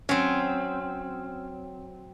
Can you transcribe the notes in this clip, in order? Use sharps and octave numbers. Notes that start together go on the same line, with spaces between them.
F#3 C4 C#4